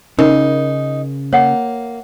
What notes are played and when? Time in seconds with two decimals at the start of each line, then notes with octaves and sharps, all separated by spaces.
0.19 C#3 D#4 A#4
1.33 A#3 C#5 F#5